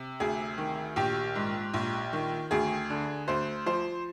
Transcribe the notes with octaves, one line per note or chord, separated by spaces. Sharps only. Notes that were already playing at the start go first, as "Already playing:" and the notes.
Already playing: C3
D2 G#4
D#3
A#1 G4
G#2
A#1
D#3
D2 G#4
D3
D2 C5
F3 C5